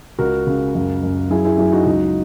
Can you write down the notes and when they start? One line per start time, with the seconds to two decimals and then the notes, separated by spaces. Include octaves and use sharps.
0.19 C#2 F#4 A#4
0.47 C#3
0.75 F#2
1.03 F#2
1.30 F#3 E4 G#4
1.45 E4 G#4
1.57 F#3 E4 G#4
1.71 D#4 F#4
1.85 C#2 D#4 F#4